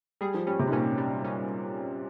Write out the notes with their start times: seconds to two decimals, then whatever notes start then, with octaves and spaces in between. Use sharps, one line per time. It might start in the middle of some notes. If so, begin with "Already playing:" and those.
0.21 G3 G#4
0.34 F3
0.47 G3 C#4
0.59 C3
0.67 G#2
0.72 A#2 C#4
0.98 G3
1.25 C#4